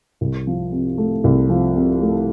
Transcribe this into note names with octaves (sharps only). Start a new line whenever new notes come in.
C2
F3
C3
A3
C2
F3
C3
A3